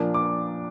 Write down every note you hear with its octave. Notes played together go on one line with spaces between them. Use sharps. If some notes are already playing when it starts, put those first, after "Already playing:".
Already playing: A#2 F3 A#3 D4
D6